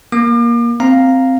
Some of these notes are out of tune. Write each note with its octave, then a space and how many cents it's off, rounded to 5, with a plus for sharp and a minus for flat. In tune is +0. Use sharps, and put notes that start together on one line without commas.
A#3 +15 D6 +40
C4 +0 F5 +0 A#5 +0